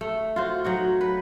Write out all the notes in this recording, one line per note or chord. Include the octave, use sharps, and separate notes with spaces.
A3
F4 F#4 C5
F#3 D#4 F#4
B4